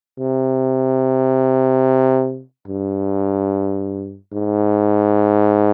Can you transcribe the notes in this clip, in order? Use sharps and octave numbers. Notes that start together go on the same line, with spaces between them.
C3
G2
G#2